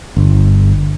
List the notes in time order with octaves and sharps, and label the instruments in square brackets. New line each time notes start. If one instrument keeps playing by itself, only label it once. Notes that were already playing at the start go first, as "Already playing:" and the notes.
[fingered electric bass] G1